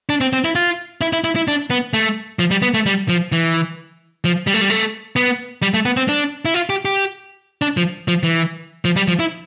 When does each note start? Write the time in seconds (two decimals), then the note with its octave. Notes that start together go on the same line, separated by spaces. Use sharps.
0.09 D4
0.21 C4
0.33 C4
0.44 E4
0.55 F4
1.01 E4
1.13 E4
1.24 E4
1.36 E4
1.48 D4
1.70 B3
1.93 A3
2.39 F3
2.51 G3
2.62 B3
2.74 A3
2.86 G3
3.09 F3
3.32 E3
4.25 F3
4.47 G3
4.54 A3
4.61 G3
4.70 A3
5.16 B3
5.62 G3
5.74 A3
5.85 B3
5.97 C4
6.09 D4
6.45 E4
6.54 F4
6.70 G4
6.85 G4
7.62 D4
7.77 F3
8.08 F3
8.23 E3
8.85 F3
8.96 G3
9.08 F3
9.19 E4